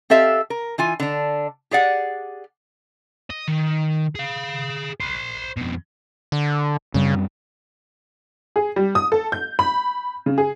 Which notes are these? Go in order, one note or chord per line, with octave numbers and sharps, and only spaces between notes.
C4 G4 A4 E5 F5
A#4
E3 F4 G#5
D3 D4
G4 G#4 D5 F#5
D#5
D#3
G#4 F5
C5 B5
F2 B2
D3
F#2 C#3 G3 C4
G#4
G3
D#6
A4
G6
B5
C#3
G#4